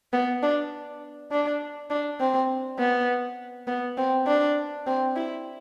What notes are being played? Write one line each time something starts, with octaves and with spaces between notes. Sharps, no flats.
B3
D4
D4
D4
C4
B3
B3
C4
D4
C4
E4